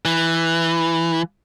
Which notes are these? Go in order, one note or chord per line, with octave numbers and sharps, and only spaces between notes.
E3